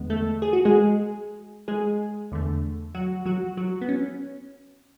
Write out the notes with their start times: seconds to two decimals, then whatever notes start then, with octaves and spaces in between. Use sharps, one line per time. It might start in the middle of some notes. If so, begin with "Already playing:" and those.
Already playing: E2 D3 G#3 B3
0.10 A3 A4
0.42 G#4
0.53 F#4
0.65 G#3 G#4
1.68 G#3 G#4
2.32 E2 D3 A3
2.95 F#3 F#4
3.26 F#3 F#4
3.57 F#3 F#4
3.81 B3
3.89 C#4